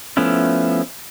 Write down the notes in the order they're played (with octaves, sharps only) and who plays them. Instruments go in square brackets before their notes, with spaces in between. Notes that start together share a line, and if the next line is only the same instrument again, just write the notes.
[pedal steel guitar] F3 A3 B3 C#4 E4